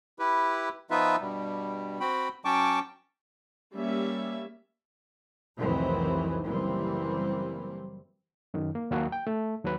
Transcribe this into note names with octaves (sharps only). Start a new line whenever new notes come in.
E4 G4 B4
F3 B3 D#4 F4 B4 E5
G2 B2 G3
C4 F#4 G5 B5
F#3 C#4 G5 A5 C#6 D6
G3 A#3 C#4 E5
F1 C2 D#3 E3 F#3 C4
F#1 E3 G3 A#3 C4
F#2 D#3
A#3
D#2 F#3 A#3 F#4 A#4
G5
A3
D#2 F#3 B4